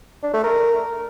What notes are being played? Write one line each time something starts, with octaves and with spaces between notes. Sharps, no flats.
D4
A3
A#4